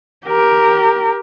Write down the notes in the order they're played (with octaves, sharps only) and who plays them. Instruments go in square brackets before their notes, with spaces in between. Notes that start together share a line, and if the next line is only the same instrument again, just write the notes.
[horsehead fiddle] G4 A#4